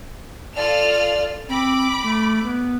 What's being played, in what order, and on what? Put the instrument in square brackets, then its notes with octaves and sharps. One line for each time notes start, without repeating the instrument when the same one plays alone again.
[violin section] F4 A4 F6 [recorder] D5
[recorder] C4 [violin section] B5 D6
[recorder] A3
B3